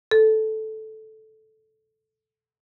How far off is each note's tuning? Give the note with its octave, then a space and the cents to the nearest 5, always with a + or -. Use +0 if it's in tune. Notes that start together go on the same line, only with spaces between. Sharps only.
A4 -10